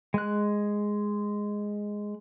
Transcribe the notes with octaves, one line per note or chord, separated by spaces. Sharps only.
G#3 F#6